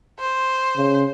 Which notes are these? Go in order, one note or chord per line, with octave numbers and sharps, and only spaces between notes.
C5
C#3